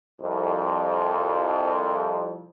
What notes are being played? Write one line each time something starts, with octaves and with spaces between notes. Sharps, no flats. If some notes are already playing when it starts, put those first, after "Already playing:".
C2 F2